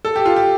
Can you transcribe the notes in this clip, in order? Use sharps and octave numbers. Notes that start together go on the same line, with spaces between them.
A4
G4
F4
G4